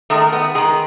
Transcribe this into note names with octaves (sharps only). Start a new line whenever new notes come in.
D#3 G#3 A3
B3
D#3 G#3 G#4